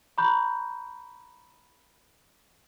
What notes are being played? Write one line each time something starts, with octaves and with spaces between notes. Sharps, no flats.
A#5 B5 C#6 F#6 G6